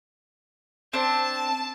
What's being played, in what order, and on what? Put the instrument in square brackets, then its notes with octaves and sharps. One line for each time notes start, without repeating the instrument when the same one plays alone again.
[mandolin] C4 D4 [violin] A5